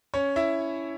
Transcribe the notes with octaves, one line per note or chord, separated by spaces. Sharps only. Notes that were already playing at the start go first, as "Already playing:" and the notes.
C#4 C#5
E4 E5